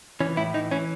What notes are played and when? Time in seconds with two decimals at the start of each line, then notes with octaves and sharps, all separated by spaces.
0.21 E3 C#4
0.37 A2 E4
0.54 E3 D#4
0.71 E3 C#4